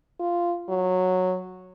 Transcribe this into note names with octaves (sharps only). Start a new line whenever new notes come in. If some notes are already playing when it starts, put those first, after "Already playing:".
F4
F#3